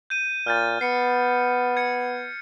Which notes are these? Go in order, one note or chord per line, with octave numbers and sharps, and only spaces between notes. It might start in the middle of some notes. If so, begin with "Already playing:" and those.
G6 D#7
A#2 F6 G6 A6
B3 C7 C#7
G#6 C#7